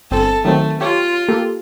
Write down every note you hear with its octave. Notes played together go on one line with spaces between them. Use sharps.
G1 C4 A4
D#3 F#3 A3 C4
F4 G4 C#5
A#3 G4 A4